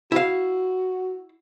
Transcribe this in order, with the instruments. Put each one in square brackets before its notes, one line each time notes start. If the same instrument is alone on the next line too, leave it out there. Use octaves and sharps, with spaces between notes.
[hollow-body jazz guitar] E4 F5 [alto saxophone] F#4